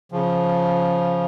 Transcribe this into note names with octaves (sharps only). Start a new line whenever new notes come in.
C#3 F3